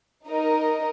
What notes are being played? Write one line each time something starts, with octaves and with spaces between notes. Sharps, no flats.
D#4 A#4 D#5